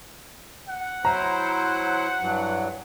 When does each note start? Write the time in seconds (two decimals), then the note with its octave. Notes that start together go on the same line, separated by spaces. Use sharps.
0.69 F#5
1.05 F#3 E4 C5 A#5
2.22 G2 E3 F#3